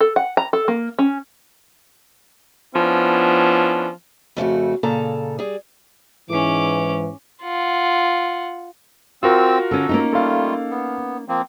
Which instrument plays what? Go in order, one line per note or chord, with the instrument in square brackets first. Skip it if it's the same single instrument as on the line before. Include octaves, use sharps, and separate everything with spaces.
[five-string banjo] A4
F#5
A#5
A4
A#3
C#4
[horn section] F3 B3 C#4 D4 E4
[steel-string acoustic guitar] F2 C#3 A3 F#4
A#2 C#3 A4 A5 A#5
G3 G#4
[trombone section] G#2 E3 [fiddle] C#4 D6
[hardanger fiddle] F4 F#5
[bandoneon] C4 E6 [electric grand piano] F4 F#4 A#4
[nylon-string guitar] D3 C#4 [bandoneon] A4
[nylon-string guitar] A#3 C#4 D#4
[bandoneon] G3 A3 F4 [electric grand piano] A4 F5
[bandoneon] B3
F3 A#3 C4